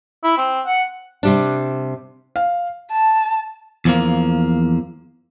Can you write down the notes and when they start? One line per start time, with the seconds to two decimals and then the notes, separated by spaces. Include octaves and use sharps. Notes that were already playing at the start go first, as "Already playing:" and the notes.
0.24 E4
0.37 C4
0.66 F#5
1.23 C3 G3 D4
2.36 F5
2.91 A5
3.85 E2 F3 A#3